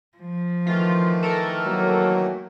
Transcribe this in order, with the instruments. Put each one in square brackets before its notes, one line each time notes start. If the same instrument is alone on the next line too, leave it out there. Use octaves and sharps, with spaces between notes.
[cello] F3
[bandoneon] D#3 E3 A3 [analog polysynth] F4
[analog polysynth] A4 A#4
[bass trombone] F#3 [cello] A#3